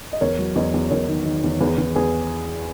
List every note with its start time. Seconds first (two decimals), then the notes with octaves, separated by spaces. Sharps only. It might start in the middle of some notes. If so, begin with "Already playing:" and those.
0.13 D#5
0.21 E2 A#4 C#5
0.39 F#3
0.56 E2 B4 D#5
0.74 E2
0.91 E2 A#4 C#5
1.08 D#3
1.26 D#3
1.44 E2
1.60 E2 G#4 B4
1.78 E2
1.95 E2 G#4 B4